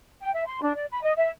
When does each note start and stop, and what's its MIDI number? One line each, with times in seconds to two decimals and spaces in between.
0.22 0.31 79
0.33 0.44 76
0.46 0.58 84
0.61 0.72 62
0.75 0.85 74
0.90 0.99 83
1.02 1.11 75
1.16 1.29 76